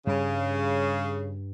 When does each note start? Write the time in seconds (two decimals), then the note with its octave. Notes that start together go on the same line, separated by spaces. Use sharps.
0.07 G2 C#3 G3